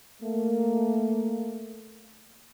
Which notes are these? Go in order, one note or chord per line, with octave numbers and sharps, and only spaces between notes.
A3 A#3